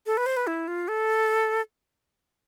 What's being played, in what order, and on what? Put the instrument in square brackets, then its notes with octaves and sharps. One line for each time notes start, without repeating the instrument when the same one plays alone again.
[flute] A4
B4
C5
B4
E4
F4
A4